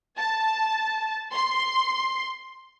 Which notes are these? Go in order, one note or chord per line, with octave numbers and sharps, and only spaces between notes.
A5
C6